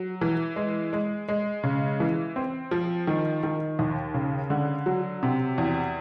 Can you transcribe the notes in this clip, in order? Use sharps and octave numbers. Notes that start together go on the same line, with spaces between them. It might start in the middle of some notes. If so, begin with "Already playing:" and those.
Already playing: F#3
E3
G#3
G#3
G#3
C#3
E3
C4
F3
D#3
D#3
D#2
C#3
D3
F#3
C3
E2